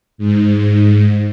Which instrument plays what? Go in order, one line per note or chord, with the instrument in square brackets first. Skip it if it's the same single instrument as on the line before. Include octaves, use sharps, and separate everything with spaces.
[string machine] G#2